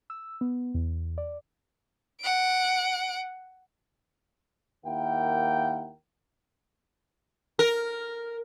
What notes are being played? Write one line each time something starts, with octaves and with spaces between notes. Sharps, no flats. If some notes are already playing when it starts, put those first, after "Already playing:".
E6
B3
E2
D5
F#5 D7
D#2 A#3 E4 A#4 F#5 G5
A#4